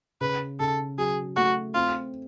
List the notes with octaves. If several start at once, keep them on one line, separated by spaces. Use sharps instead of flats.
C#3 B4
C#3 A4
F#3 G#4
A3 F#4
C4 F4